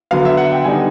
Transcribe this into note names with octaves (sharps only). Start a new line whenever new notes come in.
D3 F#3 B3 F5
E5
F#5
G5
D3 G3 B3 D#4 G#5